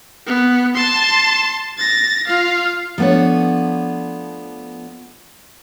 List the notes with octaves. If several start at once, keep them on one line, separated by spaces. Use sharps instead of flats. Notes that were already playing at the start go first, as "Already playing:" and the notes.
B3
A5 C6
A6 A#6
F4 F5
F3 A3 B3 D4 C#5